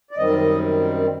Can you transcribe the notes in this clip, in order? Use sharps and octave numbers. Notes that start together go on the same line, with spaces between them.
D5
F#2 D#3 G3 C4 D#5